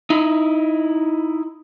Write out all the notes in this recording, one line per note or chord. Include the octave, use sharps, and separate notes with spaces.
D#4 E4